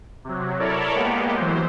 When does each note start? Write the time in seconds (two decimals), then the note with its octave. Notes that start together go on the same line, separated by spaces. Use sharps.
0.24 C3 F#3
0.59 E4 A4 A#4 C#5 D5
0.94 G#3 A#3 B3 G4
1.36 E3 F#3 C5